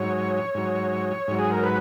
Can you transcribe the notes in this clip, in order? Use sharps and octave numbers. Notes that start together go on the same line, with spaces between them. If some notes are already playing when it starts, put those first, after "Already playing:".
Already playing: G#2 F#3 C#5
G#2 F#3
G#2 F#3
G#4
A#4
B4